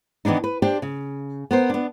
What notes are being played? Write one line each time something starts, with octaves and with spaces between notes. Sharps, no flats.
D#3 E3 B3 D4 D#4
B4
D4 G4 C5 G5
C#3
B3 A#4 C5
B3 D4